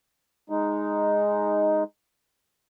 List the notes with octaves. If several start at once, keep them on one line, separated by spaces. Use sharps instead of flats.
G#3 D#4